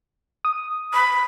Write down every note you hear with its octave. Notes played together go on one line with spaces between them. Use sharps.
D#6
B5